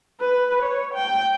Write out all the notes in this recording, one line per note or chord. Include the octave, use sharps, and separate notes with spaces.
B4
C#5
G5